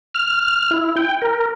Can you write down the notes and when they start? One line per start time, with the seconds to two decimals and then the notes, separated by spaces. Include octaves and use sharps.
0.15 F6
0.71 E4
0.97 G5
1.22 A#4